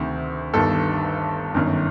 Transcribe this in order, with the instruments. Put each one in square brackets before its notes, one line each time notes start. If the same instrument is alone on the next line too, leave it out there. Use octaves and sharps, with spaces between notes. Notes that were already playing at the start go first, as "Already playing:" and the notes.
Already playing: [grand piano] D2 C3 D#3
G1 G2 D#3 A4
G1 F#2 D#3